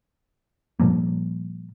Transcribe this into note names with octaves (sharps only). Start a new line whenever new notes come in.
A#2 F3 G3 A#3